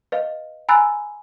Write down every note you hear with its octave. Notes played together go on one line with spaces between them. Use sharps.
B4 D#5 F5
G#5 A#5 B5 E6 F#6 A6